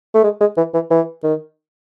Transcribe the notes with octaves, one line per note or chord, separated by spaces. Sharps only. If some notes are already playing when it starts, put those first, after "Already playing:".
A3
G#3
G#3
E3
E3
E3
D#3